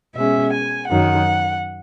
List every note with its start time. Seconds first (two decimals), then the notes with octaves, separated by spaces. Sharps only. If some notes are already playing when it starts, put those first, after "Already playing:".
0.15 B2 G#3 C#4 E5
0.53 G#5
0.89 F#2 D#3 F#3 F#5